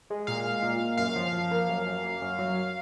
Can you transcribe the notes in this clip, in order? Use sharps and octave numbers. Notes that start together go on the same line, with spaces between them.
G#3
A#2 F5
G#3
A#2
A#2
F#2 F5
F3
F3
A#3
F#2
F#2
A#3
F#2
F#3